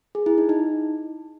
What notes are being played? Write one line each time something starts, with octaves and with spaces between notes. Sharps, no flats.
G#4
E4
D#4
D#4